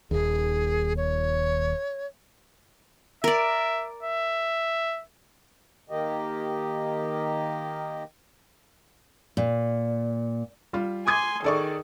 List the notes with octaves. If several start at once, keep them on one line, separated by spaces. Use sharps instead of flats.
D#1 D#2 G#4
C#5
A#4 D5 E5
E5
D#3 A#3 G4 D#5
A#2
G3 F4
G#5 C6 D6 D#6 G#6
D#3 G#4 A4 D5 C#6